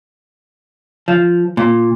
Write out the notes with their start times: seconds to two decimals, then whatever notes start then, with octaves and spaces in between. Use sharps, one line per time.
1.08 F3
1.57 A#2